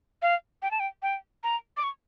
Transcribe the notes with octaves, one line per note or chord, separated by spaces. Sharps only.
F5
G5
A5
G5
G5
A#5
D6
C#6